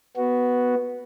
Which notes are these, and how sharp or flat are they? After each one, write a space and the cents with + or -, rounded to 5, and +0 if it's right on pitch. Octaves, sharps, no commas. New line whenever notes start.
B3 +0 F#4 +0